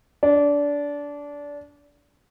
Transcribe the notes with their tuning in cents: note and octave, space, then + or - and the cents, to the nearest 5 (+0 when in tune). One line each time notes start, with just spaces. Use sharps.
D4 -20